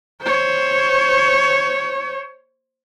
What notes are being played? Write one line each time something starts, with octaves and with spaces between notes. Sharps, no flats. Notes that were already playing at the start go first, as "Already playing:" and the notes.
C5 C#5